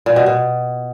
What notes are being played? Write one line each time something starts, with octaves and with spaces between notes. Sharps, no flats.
A#2
B2
B2